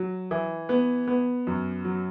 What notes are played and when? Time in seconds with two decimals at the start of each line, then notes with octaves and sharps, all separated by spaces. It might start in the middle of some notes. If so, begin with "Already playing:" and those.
Already playing: F#3
0.31 E3
0.69 B3
1.08 B3
1.47 F#2
1.85 F#3